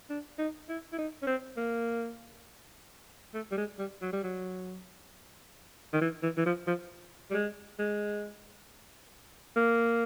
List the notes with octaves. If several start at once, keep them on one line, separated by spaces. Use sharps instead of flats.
D4
D#4
E4
E4
D#4
C#4
C4
A#3
A3
G3
G#3
G3
F#3
G3
F#3
D#3
E3
E3
E3
F3
F3
G3
G#3
G#3
A#3